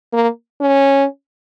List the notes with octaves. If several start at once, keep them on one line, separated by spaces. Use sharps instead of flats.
A#3
C#4